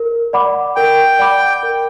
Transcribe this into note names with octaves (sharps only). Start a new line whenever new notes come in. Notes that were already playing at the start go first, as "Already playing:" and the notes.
Already playing: A#4
D5 F#5 B5 D6
A#4 G5
D5 F#5 B5 D6
A#4